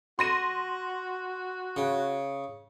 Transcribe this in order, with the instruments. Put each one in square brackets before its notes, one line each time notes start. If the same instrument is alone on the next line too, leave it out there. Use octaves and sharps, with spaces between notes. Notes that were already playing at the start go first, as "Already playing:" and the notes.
[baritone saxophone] F#4 [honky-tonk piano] C6 A#6 D#7
[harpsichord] C#3